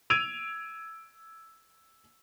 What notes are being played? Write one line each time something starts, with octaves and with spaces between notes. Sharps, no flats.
E6 G#6 D7 D#7 F7